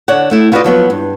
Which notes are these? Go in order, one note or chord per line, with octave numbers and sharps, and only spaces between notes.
D3 C#5 D5 F#5
A3 E4
F4 F#4 B4 C5 D5 D#5
F3 F#3 B3
G2